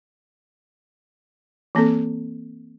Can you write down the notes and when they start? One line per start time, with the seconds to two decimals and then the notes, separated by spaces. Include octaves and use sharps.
1.75 E3 A#3 C4 A4